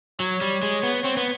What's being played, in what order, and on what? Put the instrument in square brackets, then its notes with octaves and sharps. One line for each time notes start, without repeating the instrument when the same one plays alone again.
[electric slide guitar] F#3 [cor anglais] C#5
[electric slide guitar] G3
G#3
B3
[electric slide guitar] C4 [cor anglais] C#5
[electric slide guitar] B3